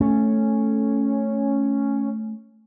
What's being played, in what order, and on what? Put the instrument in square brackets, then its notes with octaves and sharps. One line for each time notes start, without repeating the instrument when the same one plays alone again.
[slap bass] A3 [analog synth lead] C#4